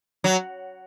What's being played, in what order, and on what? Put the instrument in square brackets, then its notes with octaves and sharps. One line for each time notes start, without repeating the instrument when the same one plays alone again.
[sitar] F#3